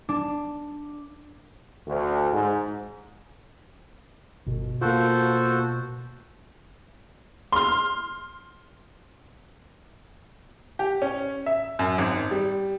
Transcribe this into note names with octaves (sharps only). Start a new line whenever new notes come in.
D4
D2
G#2
G1 B2
A#3 F4 F#4 A4 C5
C6 F6
G4
C#4
E5
F#2
G#1
G3